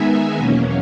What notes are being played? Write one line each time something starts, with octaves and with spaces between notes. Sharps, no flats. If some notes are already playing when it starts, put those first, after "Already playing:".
Already playing: D#3 G#3 B3 D#4 E5 G#5
E2 B2 F#3 A#3 C#4